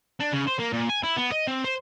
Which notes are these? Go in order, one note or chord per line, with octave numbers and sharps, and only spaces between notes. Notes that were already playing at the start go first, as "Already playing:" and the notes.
D4
C#3
C5
A#3
A#2
G#5
E4
B3
D#5
C4
C5